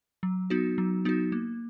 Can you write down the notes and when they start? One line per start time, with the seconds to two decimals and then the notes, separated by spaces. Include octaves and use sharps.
0.23 F#3
0.50 B3 D#4 F#4
0.78 F#3
1.05 B3 D#4 F#4
1.32 A#3